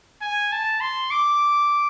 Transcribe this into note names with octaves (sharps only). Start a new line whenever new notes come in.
G#5
A5
C6
D6